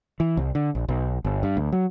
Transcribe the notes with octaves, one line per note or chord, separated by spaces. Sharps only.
E3
C2
D3
A#1
B1
G1
G2
D2
F#3